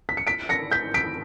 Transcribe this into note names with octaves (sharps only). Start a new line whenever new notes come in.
B6
C#7
B6 D7
A#6 C#7
G6 B6
B6 D7